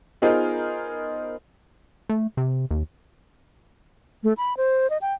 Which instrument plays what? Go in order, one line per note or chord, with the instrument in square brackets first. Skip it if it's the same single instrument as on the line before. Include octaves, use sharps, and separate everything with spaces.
[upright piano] B3 D#4 F4 G#4 A#4 C5
[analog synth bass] A3
C3
D#2
[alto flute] A3
B5
C5
D#5
G5